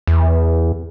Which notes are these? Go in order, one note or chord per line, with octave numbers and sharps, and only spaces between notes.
E2